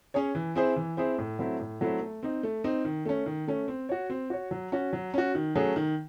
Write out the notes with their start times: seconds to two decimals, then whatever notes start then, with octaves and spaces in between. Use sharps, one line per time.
0.14 C#4 G#4 C#5
0.35 E3
0.55 C4 E4 G#4 C5
0.76 E3
0.97 C4 E4 G#4 C5
1.18 A2
1.39 F#3 A3 C4 E4
1.60 A2
1.81 F#3 A3 C4 E4
2.01 A3
2.23 C4 D#4
2.43 A3
2.64 C4 D#4
2.85 D#3
3.05 A3 C#4
3.26 D#3
3.48 A3 C#4
3.68 C4
3.89 F#4 C#5
4.10 C4
4.30 F#4 C#5
4.51 F#3
4.72 C#4 F#4
4.93 F#3
5.14 C#4 F#4
5.35 D#3
5.55 F#3 A3 C#4 G#4
5.76 D#3